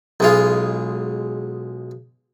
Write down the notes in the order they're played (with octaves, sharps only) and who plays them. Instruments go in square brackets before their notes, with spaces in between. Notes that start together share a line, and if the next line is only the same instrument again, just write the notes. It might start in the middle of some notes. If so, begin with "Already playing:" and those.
[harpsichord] B1 G#3 F4